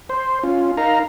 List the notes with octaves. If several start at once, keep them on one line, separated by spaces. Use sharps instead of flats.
C5
C#4 F4
D#4 A#4 F5 A#5